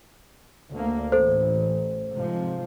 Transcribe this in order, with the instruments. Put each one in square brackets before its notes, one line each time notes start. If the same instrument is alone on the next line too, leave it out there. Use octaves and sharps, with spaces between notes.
[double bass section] D2 A#3
[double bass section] A1 [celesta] A4 C5
[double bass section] G#2 C3 F3